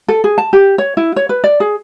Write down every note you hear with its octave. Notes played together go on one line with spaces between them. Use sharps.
A4
G#4
A5
G4
C#5
E4
C#5
B4
D5
G#4